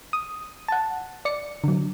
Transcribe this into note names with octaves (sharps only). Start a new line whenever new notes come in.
D#6
F#5 A5
D5 C#7
D3 F#3